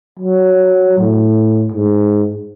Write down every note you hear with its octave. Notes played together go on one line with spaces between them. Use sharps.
F#3
A2
G#2